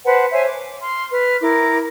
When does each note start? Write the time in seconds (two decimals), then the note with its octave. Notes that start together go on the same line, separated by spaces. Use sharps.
0.05 B4 C5 F#5 A5
0.31 C5 C#5 E5 G#5
0.47 D6
0.81 C6 F6
1.11 B4 F6
1.41 E4 A#4 D6